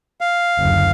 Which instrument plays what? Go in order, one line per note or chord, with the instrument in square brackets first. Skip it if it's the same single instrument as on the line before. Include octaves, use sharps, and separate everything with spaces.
[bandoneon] F5
[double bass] F#1 D2